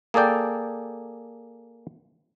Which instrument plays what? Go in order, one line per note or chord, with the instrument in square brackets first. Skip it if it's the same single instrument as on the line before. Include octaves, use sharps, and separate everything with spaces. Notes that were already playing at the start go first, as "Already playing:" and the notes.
[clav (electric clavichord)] A#3 G#4 A4 D5 G5